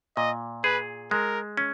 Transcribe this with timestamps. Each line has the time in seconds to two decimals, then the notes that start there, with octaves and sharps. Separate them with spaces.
0.17 A#2 D#5
0.64 G#4 B4
1.11 G#3 A#4
1.57 C#4